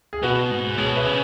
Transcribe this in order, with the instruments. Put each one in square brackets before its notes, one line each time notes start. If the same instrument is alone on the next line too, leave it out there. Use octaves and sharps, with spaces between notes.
[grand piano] G#4
[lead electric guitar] B2 [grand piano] F#4 B4
[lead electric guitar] G#2
[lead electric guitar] B2 [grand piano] G#4 C#5
[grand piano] B4 E5
[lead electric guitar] C#3